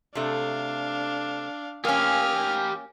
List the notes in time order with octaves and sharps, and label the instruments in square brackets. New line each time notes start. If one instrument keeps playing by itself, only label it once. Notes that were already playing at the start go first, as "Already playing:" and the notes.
[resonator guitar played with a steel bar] C3 A3 [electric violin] D4 F5
[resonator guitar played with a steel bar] A#3 C#4 [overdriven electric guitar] G4 F5 [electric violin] G#5 F6